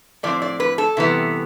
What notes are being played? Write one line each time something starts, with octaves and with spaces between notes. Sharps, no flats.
A2 F3 C4 D5
D5
B4
A4
C3 E3 G3 B3